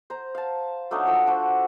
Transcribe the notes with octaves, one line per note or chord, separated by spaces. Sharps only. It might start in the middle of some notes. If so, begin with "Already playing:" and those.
C5 A#5
F5 A5
F#3 A3 D4 D#4
F3 A4 E6
D4 F#4 C5